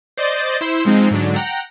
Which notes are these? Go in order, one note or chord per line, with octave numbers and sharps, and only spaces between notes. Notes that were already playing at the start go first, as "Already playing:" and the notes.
C5 D5 D#5 G6 A6
E4 C5 C6 E6
F3 G#3 C4 D#4
G#2 D3 F#3 D4
F#5 G5 A#5